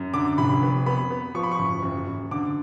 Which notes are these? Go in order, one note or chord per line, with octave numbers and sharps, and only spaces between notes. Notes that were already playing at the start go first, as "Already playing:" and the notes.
Already playing: F#2
D3 D6
F1 B5
B3
B3 B5
B3
F3 C#6
B5
C#6
F#1
F#1
F#1
D3 D6